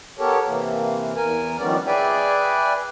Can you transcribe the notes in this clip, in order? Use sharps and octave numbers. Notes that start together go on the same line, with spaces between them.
B3 G4 A4 A#4 C#5
C3 E3 A#3
E2 A#4 G#5
F2 D#3 G3 B3 C#4 D5
G#4 B4 D5 E5 G5 G#5